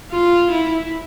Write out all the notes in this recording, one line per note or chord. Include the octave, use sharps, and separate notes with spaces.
F4
E4